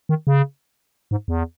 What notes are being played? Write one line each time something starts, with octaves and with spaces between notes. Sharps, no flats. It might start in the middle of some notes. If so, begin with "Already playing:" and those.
D#3
C#3
G#2
E2